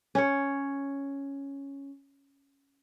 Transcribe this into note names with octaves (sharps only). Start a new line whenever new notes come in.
C#4 C#5